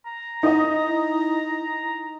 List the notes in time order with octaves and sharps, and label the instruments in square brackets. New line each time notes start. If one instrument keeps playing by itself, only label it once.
[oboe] A#5
[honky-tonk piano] D#4 D#5 [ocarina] E4